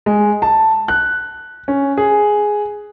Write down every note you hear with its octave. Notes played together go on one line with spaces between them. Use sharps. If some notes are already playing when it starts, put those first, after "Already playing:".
G#3
A5
F#6
C#4
G#4